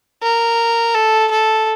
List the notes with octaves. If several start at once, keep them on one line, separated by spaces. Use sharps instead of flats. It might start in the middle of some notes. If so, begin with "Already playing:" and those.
A#4
A4
A4